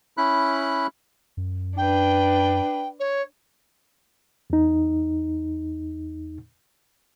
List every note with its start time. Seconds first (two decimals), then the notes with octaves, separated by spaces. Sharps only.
0.17 C#4 E4 B5 F#6
1.37 F#2
1.77 D4 B4 G5
2.99 C#5
4.50 E2 D#4